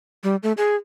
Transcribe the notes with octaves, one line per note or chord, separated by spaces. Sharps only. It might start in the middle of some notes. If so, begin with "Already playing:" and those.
G3
A3
G#4